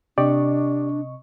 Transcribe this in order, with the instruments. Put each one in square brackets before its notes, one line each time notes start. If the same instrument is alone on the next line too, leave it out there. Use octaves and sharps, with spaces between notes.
[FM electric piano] C3 D#5 C#6 [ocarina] D4 [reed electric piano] G4 D5